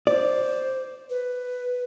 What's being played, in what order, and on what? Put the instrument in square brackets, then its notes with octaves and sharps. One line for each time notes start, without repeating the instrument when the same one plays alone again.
[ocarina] C5 [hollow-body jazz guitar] D5
[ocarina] B4